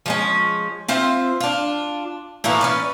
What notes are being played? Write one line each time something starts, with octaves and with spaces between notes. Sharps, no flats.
F3 G#3 C#4
C4 F4 C5 E5
D4 F4
A2 E3 A3 A#3
C#4 B4 D5